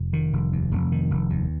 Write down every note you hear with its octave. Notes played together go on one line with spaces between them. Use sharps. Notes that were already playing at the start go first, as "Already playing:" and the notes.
Already playing: F1
D#3
F1
D#2
F1
D#3
F1
D#2